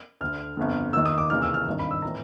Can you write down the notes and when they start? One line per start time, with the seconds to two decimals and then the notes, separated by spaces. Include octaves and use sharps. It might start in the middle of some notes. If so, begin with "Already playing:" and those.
0.21 D2 D3 F6
0.57 G1 F2 D3
0.93 D#2 D#3 E6
1.06 D#6
1.18 D6
1.30 F1 D#2 C#3 E3 F6
1.42 E6
1.54 F6
1.66 G#1 G2 D#3
1.79 B5
1.91 E6
2.02 A2 E3 A#5